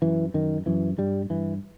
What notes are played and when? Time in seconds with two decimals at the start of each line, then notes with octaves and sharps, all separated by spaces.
0.02 F#2 E3
0.34 F#2 D#3
0.66 F#2 E3
0.98 G2 G3
1.30 G2 E3